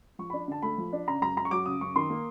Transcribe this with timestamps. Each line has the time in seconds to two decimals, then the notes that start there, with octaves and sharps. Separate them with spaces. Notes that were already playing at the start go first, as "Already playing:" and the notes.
0.19 F3 C#6
0.30 D4 B5
0.48 D3 A5
0.62 A3 B5
0.78 F3
0.93 D4
1.07 C#3 A#5
1.22 F#2 A#5
1.37 F#2 A#5
1.45 C#6
1.51 F#3 D6
1.65 C#3 D#6
1.81 F#2 C#6
1.96 D#3 C6
2.10 A#3